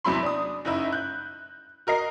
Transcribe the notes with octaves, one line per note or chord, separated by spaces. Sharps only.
E2 C3 F#3 E4 B5 C6
D4 D#6
F#1 D#4 E4
F#6 G6
F#4 A#4 D#5 C7